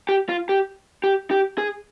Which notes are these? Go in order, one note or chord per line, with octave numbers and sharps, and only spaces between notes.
G4
F4
G4
G4
G4
G#4